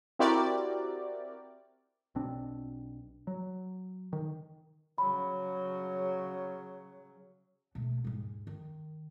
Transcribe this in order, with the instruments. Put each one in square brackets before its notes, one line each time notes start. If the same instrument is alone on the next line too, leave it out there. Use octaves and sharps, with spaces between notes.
[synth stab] C4 E4 F#4 G4 A#4 D5
[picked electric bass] B1 B2 C4 D4
F#3
D#3
[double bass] C#3 F#3 [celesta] B5
[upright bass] B2 A3
D#2 G#2
D#3